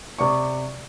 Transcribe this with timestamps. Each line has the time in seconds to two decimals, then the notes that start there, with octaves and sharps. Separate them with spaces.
0.19 C3 D5 C#6